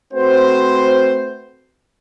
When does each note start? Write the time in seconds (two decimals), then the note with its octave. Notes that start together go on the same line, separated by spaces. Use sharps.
0.14 A3 C4 F#4 B4 C5